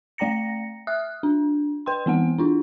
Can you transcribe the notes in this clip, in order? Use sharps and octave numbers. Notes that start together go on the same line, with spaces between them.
A3 D5 G5 A#5 A#6 C#7
E5 D#6 F6 F#6
D4
B4 G5 C6
E3 B3 C4 F#5
D4 E4 F4